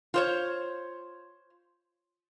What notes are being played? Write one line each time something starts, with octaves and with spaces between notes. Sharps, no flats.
F4 C5 C#5